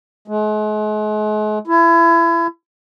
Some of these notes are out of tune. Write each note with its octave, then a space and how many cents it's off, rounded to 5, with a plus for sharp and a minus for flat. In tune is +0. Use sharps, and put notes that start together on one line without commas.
G#3 +40
E4 +30